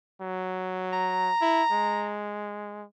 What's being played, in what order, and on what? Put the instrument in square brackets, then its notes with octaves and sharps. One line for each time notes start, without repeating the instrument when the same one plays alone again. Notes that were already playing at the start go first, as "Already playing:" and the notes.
[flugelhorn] F#3
[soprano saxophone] A#5
[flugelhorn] E4
G#3